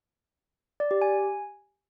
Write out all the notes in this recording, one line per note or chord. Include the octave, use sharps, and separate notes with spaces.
D5
G4
G#5